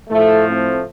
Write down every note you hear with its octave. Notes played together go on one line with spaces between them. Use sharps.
A2 F3 A3
A3 C4